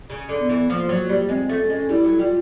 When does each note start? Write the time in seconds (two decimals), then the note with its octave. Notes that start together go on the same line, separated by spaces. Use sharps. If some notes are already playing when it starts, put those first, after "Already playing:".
0.10 C#3
0.29 D3
0.39 B3
0.49 E3
0.69 F3 A#3
0.89 F#3
0.99 A#3
1.09 G3
1.29 G#3 C4
1.49 A3
1.60 C#4
1.70 G#3
1.89 G3 E4
2.04 F#3
2.19 G3 F4